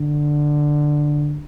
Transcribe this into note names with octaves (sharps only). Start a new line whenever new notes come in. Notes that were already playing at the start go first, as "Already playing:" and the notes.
Already playing: D3